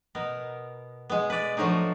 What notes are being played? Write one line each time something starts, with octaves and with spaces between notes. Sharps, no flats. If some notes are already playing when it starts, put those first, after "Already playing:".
B2 B3 A#4
G#3 B3
B4 D5
F3 F#3 A3 D4 D#4